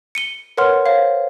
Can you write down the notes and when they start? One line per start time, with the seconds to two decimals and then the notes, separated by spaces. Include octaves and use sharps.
0.15 C#7 D#7 G7
0.57 A#4 B4 C#5 F#5 C6 F6
0.86 C5 C#5 F5